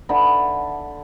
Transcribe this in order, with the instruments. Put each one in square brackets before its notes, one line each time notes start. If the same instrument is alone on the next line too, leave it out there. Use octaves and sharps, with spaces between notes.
[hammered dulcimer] D3 E5 B5